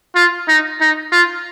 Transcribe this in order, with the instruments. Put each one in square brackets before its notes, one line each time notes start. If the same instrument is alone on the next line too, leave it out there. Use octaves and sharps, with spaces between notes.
[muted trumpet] F4
D#4
D#4
F4